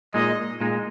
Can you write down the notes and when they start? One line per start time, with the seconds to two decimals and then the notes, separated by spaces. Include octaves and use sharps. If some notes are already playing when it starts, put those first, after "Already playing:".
0.14 A#2 G#3 D#4 D#5
0.61 A#2 G#3 D#4